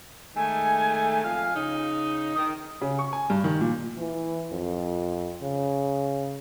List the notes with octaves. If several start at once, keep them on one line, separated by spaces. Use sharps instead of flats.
D#3 G#3 A3 G#5
F2 F3 F5
C#3 D#4
D#3 D#6
C#3
C#6
G#5
G2
D#3
A#2
E3
F2
C#3